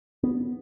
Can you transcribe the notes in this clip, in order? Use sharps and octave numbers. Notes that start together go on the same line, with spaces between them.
B3